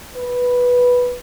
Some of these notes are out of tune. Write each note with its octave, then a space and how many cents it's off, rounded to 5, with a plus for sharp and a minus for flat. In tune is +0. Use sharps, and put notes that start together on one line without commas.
B4 -5